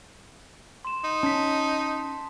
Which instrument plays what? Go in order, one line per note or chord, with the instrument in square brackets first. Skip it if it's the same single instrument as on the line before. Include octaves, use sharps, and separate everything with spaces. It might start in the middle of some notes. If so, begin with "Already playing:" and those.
[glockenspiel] C6 E7
[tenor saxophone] D#4 [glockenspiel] C6
[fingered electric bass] C#4 [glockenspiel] A5 B6